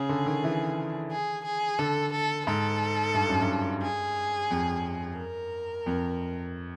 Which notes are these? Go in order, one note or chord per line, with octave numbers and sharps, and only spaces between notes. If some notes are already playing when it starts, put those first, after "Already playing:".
Already playing: C#3 G#4
D3
D#3
E3
G#4
G#4
D3 A4
A4
G#2 A4
G2
F#2
G2
G#4
F2
A#4
F2